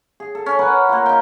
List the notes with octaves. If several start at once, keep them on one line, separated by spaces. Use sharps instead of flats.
G#4
A4
C#4
A#4 B4 F#5
A#3 F4
D#4 G5